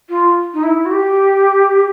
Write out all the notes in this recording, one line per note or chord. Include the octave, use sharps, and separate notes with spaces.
F4
D#4
E4
F#4
G4